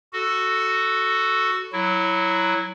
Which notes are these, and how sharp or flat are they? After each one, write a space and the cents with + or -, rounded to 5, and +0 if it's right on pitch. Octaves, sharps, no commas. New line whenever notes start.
F#4 +0 A4 +0
F#3 +0 E4 +0